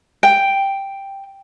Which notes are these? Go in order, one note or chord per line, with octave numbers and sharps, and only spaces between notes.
G5